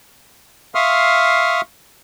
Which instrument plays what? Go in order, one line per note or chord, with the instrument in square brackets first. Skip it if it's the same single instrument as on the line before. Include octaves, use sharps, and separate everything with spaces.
[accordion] E5 F5 C6 C#6 D#6 F6